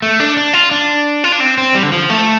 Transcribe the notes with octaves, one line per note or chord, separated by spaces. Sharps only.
A3
D4
D4
F4
D4
F4
D4
C4
C4
G3
D3
F3
A3